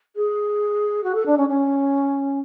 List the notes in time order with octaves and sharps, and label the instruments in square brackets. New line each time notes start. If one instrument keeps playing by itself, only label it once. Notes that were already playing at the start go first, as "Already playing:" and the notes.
[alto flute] G#4
F#4
A4
D4
C#4
C#4